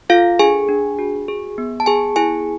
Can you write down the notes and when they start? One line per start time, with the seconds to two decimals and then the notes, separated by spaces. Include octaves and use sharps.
0.09 F4 A4 F5
0.39 D4 G#4 G#5
0.68 D4
0.99 F#4
1.28 G#4
1.58 B3
1.80 A5
1.86 B3 G#4 G#5
2.16 E4 G#4 G#5